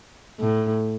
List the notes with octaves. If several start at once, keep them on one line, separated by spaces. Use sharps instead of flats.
A2